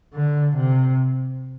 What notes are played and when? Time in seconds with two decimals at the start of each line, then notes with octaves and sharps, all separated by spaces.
0.15 D3
0.56 C3